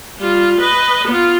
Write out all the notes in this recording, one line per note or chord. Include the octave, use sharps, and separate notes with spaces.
G3 F4
B4 D#5
B3 F4